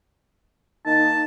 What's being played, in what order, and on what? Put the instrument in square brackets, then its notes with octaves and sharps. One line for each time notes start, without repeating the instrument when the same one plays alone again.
[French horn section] D#3 A#3 D#4 [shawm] A5